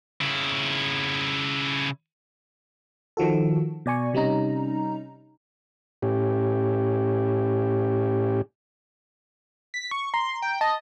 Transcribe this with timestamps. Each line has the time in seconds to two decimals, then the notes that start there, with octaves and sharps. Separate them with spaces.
0.21 C#3 E4
3.17 D#3 F3 F#4 A4
3.86 B2 D5 G#5 C#6
4.14 C3 G3 C#4 D#4 A#5
6.03 A2 C#4 G4
9.74 B6
9.91 C#6
10.14 A#5 C6
10.42 G5
10.61 D#5 A5